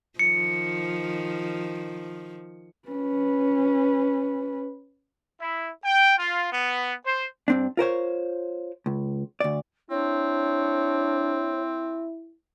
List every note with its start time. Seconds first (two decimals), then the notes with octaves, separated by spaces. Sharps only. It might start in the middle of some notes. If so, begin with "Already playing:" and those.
0.19 D#3 F3 C#7
2.89 C#4 B4
5.41 E4
5.84 G5
6.18 F4
6.52 B3
7.06 C5
7.48 G2 C4 D4
7.77 F4 A#4 C5 C#5
8.86 C#2
9.40 D2 D5
9.90 C4 D4 E4 C#5